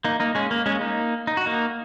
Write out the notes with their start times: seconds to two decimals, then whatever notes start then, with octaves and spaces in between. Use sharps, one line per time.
0.04 A#3 D#4
0.20 A#3 D#4
0.35 G#3 C#4
0.51 A#3
0.66 G#3 C#4
0.81 A#3 D#4
1.27 D#4
1.37 F#4
1.46 A#3 D#4